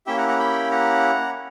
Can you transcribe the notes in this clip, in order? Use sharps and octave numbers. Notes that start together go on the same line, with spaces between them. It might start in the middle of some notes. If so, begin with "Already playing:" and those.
A#3 C#4 E4 G4 E5 G5
F#5 A#5
F#5 A#5
G5 B5
F#5 A#5